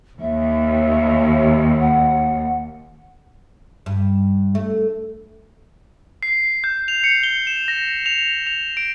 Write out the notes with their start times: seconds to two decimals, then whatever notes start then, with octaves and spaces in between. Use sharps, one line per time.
0.20 D#2 E5
1.80 F#5
3.86 G2
4.55 A3
6.23 C7
6.64 G6
6.88 F7
7.04 C#7
7.23 G7
7.47 E7
7.68 A#6
8.06 F7
8.47 F7
8.77 D7